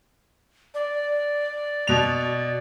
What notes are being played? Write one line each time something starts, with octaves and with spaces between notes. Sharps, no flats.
D5
B2 F7